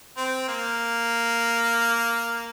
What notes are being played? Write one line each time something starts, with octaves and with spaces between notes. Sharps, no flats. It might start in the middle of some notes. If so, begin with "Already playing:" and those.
C4
A#3